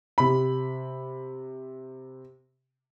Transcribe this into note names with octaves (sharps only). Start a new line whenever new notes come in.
C3 B5